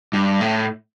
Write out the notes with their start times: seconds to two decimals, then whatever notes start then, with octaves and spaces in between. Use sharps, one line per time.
0.13 G2
0.41 A2